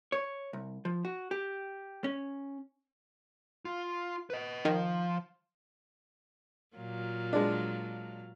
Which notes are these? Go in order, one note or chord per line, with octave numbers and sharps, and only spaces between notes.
C#5
C2
F3
F#4
G4
C#4
F4
B4 D#5
D#3 F3
A#2 F#3 F4
G#3 D4